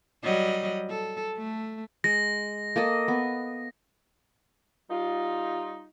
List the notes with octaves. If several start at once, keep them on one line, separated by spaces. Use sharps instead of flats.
F#3 G3 D#5
A4
A3
G#3 A#6
A#3 A4 D#5
B3
G3 D#4 F4